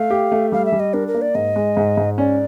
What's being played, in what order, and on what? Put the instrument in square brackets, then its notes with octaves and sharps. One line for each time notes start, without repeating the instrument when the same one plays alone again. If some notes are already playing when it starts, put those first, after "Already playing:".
Already playing: [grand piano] A3 [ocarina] F5
[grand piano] G4
A3
[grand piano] G3 [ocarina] F5
[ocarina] E5
[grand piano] G3
[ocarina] D#5
[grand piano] D4 [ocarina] A#4
[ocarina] A#4
[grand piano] A#3
[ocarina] D5
[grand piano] G#2 [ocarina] D#5
[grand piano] G#3
G#2
G#2
[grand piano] C#4 [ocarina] D5